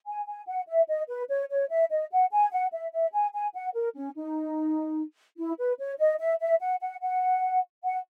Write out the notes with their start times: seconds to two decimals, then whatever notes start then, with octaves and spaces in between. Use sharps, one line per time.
0.07 G#5
0.27 G#5
0.47 F#5
0.68 E5
0.88 D#5
1.08 B4
1.29 C#5
1.50 C#5
1.70 E5
1.91 D#5
2.11 F#5
2.32 G#5
2.52 F#5
2.73 E5
2.93 E5
3.13 G#5
3.34 G#5
3.55 F#5
3.74 A#4
3.96 C#4
4.16 D#4
5.38 E4
5.59 B4
5.79 C#5
5.99 D#5
6.19 E5
6.41 E5
6.60 F#5
6.81 F#5
7.02 F#5
7.84 F#5